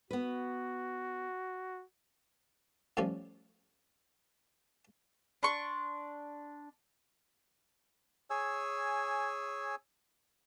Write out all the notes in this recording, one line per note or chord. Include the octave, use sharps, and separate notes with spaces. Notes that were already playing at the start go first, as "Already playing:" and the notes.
B3 F#4 B4
A2 F3 G3 C#4 G#5
D4 C6 C#6
G#4 C#5 G#5 E6